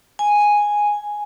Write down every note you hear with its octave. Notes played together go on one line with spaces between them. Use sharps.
G#5